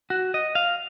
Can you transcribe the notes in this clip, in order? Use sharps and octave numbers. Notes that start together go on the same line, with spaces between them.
F#4
D#5
F5